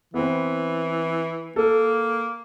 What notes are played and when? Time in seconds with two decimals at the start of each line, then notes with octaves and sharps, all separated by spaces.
0.14 E3 B3 C4
1.56 A#3 A4